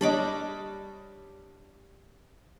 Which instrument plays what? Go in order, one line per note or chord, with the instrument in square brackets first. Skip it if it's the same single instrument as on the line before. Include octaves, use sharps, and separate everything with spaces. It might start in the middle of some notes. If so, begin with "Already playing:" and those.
[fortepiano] G3 C#5 D#5 [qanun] D4 B5 D6